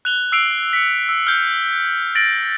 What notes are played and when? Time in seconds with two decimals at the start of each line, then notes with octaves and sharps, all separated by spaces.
0.05 F#6 F7 G7
0.32 E6 C7 D7 F7
0.73 B6 C#7
1.09 E6
1.27 F6 G6
2.15 A6 A#6 D7 F#7